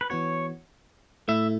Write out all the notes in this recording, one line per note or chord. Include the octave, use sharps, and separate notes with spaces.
B4
E3 B3 F#4 C#5
A2 A3 E4 E5